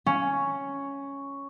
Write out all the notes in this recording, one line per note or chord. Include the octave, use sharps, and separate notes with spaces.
C#4